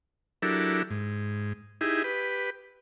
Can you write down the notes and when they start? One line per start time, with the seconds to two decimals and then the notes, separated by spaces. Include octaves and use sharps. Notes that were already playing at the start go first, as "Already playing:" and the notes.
0.42 F#3 D4 E4 G4 A4 A#4
0.91 G#2
1.81 D#4 E4 G4 G#4
2.04 G4 B4